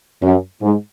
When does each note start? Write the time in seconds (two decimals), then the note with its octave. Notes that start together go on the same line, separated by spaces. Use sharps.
0.23 F#2
0.62 G#2